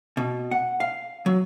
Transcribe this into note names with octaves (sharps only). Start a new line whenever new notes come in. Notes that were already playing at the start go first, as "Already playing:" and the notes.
B2
F#5
F5
F#3